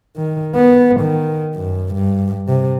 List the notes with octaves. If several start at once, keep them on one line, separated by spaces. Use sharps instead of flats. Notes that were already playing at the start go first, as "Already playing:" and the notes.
D#3
B3
D#3
F#2
G2
C3